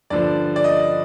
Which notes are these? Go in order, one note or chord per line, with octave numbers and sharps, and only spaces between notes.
G2 D3 F3 D5
D5
D#5